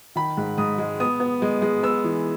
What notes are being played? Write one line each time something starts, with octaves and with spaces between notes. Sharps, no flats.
D#3 B5
G#2
G#2 D#6
G#3
B3 D#6
B3
G#3
G#3
B3 E6
E3